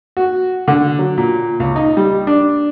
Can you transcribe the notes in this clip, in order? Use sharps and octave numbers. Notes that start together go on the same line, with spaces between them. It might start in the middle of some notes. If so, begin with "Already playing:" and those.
F#4
D3
F#3
A#2
C#2
D#4
G3
D4